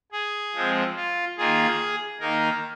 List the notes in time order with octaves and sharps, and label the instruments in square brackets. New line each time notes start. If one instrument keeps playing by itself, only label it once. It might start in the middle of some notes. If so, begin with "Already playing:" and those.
[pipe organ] G#4
F3 G#3 C4
F4
D#3 A#3 F4 G#4
D#3 A#3 D#4 A#4